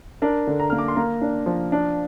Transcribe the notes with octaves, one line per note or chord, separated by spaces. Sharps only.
D4 A#4
D3
A#5
A#3 F6
D6
C6
A#3 A#5
D4
F3
D4